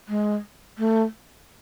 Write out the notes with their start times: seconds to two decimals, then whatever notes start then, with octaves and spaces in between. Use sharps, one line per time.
0.08 G#3
0.78 A3